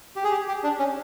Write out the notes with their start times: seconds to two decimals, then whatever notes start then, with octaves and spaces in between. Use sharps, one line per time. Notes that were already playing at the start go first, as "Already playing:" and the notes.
0.16 G4
0.24 G#4
0.31 G4
0.48 G4
0.63 D4
0.79 C#4